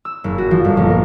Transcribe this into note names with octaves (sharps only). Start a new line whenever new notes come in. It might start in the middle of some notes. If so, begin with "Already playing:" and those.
E6
F#1
F#4
F3
G1
A#1
A#4